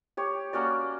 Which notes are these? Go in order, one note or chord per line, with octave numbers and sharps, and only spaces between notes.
G4 C#5
A#3 C#4 F#4 D5